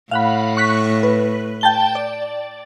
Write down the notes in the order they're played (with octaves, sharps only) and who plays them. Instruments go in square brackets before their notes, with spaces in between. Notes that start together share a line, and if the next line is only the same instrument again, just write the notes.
[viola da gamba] A2 [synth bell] F5 F#5 B5
[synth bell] C#6 F#6 B6
B4
G5 A5 G7
D5